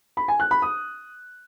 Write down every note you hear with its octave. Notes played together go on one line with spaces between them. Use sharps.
B5
G#5
F#6
B5
D#6